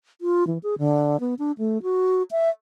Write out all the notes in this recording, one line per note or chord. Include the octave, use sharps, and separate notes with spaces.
F4
E3
G#4
D3
B3
D4
A3
F#4
E5